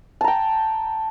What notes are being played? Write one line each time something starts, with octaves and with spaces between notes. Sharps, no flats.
G5 A5 A#5